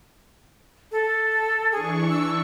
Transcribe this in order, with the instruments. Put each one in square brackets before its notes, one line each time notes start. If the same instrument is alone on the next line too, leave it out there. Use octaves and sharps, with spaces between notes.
[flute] A4
[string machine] E3 D4 C#6 [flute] G#4
[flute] E6